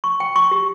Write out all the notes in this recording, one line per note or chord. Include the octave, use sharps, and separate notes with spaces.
C#6
G5
C#6
G4